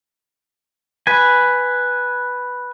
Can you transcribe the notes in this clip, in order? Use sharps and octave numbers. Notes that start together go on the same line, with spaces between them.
B4 G#5